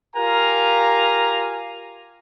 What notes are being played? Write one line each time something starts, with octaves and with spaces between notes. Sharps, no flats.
F4 G4 A#4 F5 G#5 A#5